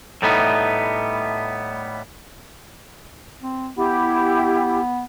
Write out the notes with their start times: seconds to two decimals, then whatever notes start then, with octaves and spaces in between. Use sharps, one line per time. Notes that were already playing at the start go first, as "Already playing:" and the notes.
0.22 A2 G3 A3 B3 D#4
3.42 C4
3.76 B3 E4 G4